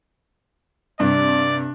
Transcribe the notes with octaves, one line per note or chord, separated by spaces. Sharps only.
G2 C3 D4 D5